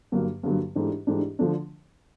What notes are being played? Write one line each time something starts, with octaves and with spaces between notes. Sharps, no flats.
G2 D3 F#3 A#3
G2 D3 F#3 A#3
G#2 E3 A3 D4 G4
G#2 E3 A3 D4 G4
D3 F3 A3 D4